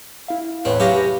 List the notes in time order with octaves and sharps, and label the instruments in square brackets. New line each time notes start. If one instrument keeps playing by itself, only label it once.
[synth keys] E4 F5
[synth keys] E2 A2 C#5 [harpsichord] C4 [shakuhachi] B4
[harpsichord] C3 C#4 G4 [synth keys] F#3 F5 A#6